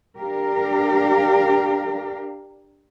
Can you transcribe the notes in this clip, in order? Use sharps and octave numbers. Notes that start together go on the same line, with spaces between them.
D4 G4 A#4 F5